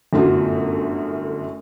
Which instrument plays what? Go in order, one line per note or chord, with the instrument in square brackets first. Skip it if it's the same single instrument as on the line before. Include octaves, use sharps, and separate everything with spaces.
[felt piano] G1 F#2 A2 B3 F4 F#4